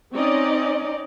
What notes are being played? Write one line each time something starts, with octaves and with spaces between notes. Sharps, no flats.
C4 C#4 D#4 D5 D#5